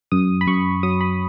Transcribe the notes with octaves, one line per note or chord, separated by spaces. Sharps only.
F#2 D#6
B5
F#2 C#6
F#3 D#6
B5